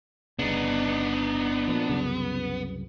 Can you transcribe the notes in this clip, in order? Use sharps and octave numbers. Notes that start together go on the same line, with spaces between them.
G1 C#3 B3 D4 D#4
A#2 F3
C2 F#2 C#3